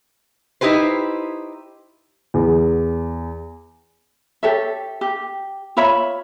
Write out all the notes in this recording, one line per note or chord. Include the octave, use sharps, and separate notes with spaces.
D#4 E4 G4 B4 C5
E2
G4 A4 C#5 E5
G4
F4 C#5 E5 B5